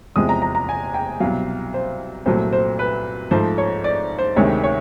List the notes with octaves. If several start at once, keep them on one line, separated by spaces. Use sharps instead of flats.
E2 C3 F3 G#3 D#6
A#5
A#5
A#5
G#5
G5
C2 B2 F#3 F5
C5
C2 A#2 F#3 A3 C5
C5
B4
G#2 F3 A3 C5
C#5
D5
C5
D2 C3 D#3 G#3 C#5
C#5